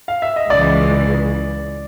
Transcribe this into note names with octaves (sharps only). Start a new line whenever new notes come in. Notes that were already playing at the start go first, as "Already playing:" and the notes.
F5
E5
D#5
C#2 C#3 E3 G#3 D5